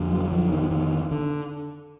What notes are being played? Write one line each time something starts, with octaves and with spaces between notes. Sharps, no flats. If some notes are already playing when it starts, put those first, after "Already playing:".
Already playing: F2 D3
F#3
F3
D#3
D#3
D3